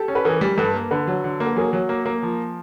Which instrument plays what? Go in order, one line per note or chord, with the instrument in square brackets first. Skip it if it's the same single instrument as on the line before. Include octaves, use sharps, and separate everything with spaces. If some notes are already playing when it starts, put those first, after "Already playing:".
Already playing: [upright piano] G4 A4
[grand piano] C#4
[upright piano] B4
[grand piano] E3 [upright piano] G#4 A#4
[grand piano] G3
[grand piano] G2 [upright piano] A4 B4
[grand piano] A#3
[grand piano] D3 [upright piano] A4 B4
[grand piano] F#3
D3
A#3
[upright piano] B4
[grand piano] F#3 [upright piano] G#4 A#4
[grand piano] F#3
A#3
A#3
F3